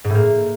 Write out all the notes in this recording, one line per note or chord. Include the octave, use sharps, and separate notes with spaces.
G#2
A2
A#3